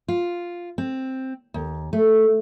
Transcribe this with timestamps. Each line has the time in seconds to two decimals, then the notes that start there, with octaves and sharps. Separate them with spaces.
0.08 F4
0.78 C4
1.54 D#2
1.93 A3